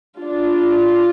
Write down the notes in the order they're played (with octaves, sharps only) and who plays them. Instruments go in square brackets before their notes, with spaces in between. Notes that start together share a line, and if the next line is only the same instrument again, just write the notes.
[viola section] D4 F4